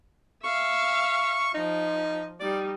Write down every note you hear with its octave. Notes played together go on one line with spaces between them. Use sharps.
E5 F5 C#6
F3 D#4
G3 D#4 D5